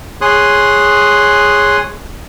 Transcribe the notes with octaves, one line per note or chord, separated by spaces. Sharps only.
G#4 C#5 C6 D#6 F#6